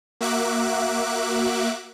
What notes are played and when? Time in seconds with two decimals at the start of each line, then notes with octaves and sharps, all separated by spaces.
0.21 A#3 F#4 E5 D6 F#6